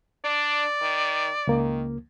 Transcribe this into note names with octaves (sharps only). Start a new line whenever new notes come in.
D4 D5
D#3
C#2 D#3 A#3